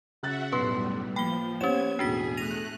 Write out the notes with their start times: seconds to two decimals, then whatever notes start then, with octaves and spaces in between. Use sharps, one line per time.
0.23 C#3 F#4 E5 F#5 F#6 A6
0.52 B1 F#2 A2 G3 B4 C6
1.16 F3 A#3 G5 B5 G7
1.61 B3 C#4 G4 C5 C#5 G#6 E7
1.99 E1 A2 D4 F#4 G#4 B6 C7
2.37 A3 F#6 A#6 D#7 F7